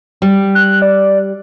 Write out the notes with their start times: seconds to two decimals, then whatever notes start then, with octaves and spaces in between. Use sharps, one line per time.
0.22 G3
0.55 F#6
0.82 D5